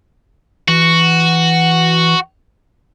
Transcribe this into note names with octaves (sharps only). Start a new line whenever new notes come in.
E3 F#4